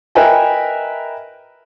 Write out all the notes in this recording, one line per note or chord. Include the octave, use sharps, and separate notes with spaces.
A#4 B4 D#5 E5 G5 G#5